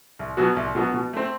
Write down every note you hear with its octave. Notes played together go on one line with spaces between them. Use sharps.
C2
B2 F#3 B3 F#4
C2
B2 F#3 B3 F#4
B2
A3 C4